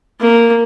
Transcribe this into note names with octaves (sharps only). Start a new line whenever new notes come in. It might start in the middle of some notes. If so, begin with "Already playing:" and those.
A#3